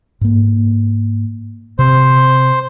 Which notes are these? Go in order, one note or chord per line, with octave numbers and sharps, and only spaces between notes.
G#2 A#3
C3 C5